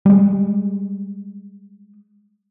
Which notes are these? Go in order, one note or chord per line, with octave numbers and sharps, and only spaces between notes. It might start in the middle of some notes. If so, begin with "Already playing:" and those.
G3 G#3